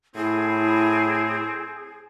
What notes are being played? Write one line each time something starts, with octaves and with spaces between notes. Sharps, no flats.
A2 C4 E4 G#4